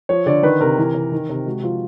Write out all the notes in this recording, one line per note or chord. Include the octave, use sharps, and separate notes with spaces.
F3 C#5
D3 D5
D#3 B4
C3 A#4
E3
C3
D#3
C3
G#3 F#4
F3 F4